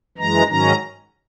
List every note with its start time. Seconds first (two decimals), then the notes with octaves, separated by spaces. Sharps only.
0.18 F#2 E3 G#3 A#5
0.48 G#2 D#3 F#3 C#4 A#5